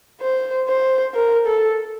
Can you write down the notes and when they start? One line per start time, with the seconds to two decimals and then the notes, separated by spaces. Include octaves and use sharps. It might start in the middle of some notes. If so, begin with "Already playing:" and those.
0.21 C5
0.68 C5
1.14 A#4
1.46 A4